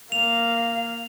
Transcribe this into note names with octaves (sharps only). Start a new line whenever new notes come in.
A#3 F5 F7